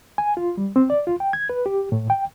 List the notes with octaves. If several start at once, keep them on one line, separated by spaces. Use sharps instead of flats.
G#5
F4
G3
C4
D5
F4
G5
G#6
B4
G4
A2
G5